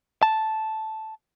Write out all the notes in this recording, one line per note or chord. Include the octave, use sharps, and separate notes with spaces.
A5